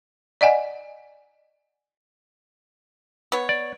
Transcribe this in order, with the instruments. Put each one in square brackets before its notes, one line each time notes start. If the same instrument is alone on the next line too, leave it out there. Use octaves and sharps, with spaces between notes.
[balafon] D5 D#5 F#5 G#5
[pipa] B3 C#5
[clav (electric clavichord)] D5